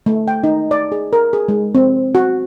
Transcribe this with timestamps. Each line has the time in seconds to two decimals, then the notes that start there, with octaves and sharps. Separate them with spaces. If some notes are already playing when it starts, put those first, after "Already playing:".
0.06 A3
0.28 G5
0.44 D#4
0.71 D5
0.92 G#4
1.13 A#4
1.33 G#4
1.48 G#3
1.75 C4
2.15 F#4